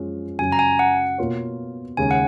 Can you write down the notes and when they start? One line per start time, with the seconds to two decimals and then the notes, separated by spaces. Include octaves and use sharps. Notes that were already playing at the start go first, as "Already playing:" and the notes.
Already playing: F#2 F3 G#3 C#4
0.39 F#2 C#3 F#3 C#4 G#5
0.52 A#5
0.59 G#5
0.79 F#5
1.18 B2 A#3 F4 A#4 C#5
1.97 D#2 C#3 G#3 G#5
2.11 F#5